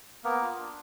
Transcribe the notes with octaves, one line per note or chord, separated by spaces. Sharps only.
A#3 B3 A#4
F4
D4